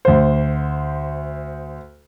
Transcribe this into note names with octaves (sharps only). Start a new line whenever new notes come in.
D2 C5